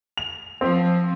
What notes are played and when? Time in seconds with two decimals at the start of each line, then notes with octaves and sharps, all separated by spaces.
0.17 F7
0.61 F3 C4